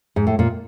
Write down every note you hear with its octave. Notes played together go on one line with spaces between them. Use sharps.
G#2
A2
A#2